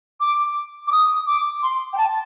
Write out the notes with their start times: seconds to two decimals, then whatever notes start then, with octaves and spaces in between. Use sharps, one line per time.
0.20 D6
0.87 D6
0.92 D#6
1.27 D6
1.63 C6
1.93 G5
1.98 A5